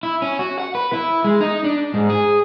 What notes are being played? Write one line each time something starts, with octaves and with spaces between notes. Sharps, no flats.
E4
C#4
F#4
F#5
B4
E4
G#3
D#4
D4
G#2
G#4